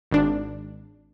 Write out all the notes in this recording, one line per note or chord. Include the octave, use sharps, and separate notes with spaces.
G#1 D4